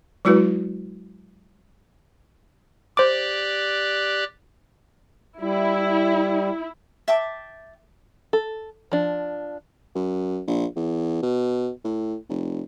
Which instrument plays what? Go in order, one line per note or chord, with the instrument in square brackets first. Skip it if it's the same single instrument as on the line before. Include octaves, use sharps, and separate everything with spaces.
[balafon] F#3 G#3 E4 F#4 B4
[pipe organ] G4 D5 F#6 [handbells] C5 D6
[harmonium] G3 [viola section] E4
[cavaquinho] E5 G5 A5 D6
[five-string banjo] A4
F3 D4
[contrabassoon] F#2
A#1
E2
B2
A2
F1